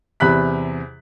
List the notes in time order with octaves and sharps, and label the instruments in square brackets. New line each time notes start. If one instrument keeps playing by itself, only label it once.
[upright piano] E2 C3 B5 F#6 B6